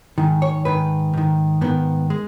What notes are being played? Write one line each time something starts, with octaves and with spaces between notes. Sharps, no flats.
G#2 D#3
C#5
G#2 D#3 B4
G#2 D#3
G#2 D#3 B3
G#3